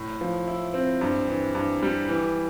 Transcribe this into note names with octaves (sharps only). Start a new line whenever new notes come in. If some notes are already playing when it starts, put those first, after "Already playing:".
Already playing: A2
F3
E4
C4
G2
E3
G2
G3
E3